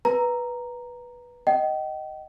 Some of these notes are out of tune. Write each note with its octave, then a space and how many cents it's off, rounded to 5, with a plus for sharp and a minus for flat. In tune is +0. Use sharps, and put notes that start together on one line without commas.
B4 -10 A#5 +0
D#5 +0 G5 -35